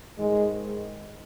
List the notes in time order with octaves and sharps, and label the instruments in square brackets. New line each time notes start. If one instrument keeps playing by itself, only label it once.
[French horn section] G#2 D#3 G#3